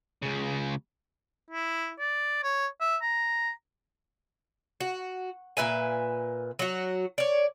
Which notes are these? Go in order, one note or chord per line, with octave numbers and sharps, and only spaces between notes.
C#2 C#3
E4
D5
C#5
E5
A#5
F#4
A#2 B4 E5 G#5
F#3 F#4
C#5 D5